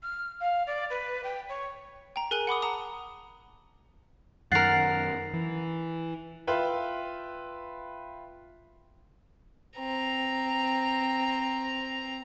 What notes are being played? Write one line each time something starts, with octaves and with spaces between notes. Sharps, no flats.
F6
F5
D5
B4
G5
C#5
G5 A#5
G#4 A#4 G#5 F#6 D#7 G7
F#5 B5 D6 D#6
F#5 A5 A#5 D#6
F#2 D#3 A#4 F#5 A6 C7
E3
F4 B4 E5 G5
C4 A#5